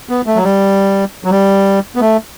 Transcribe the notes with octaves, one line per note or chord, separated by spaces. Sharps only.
B3
A3
F#3
G3
F#3
G3
B3
A3